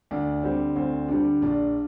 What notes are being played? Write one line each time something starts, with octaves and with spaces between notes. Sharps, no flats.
D2 D4
D3 G3 C4
D2 C4
D3 G3 D4
A#1 D4 F4